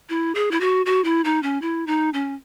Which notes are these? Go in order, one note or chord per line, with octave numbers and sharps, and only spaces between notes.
E4
G#4
E4
F#4
F#4
E4
D#4
C#4
E4
D#4
C#4